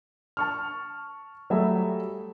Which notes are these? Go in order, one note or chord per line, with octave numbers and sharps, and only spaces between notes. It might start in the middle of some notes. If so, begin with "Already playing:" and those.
A5 C#6 F6
F#3 G3 A3 G#4 A4 E5